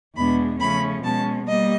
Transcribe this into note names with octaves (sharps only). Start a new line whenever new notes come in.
E2 B2 G#3 B3 D4 B5
C#3 F3 A3 C#4 B5
B2 G#3 C#4 A5
G3 A#3 D#5